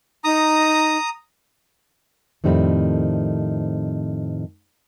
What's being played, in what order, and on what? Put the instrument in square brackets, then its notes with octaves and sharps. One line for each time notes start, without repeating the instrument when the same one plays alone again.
[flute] D#4 [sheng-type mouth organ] A#5 D#6
[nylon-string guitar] F2 A2 D#3 G3 C4 E4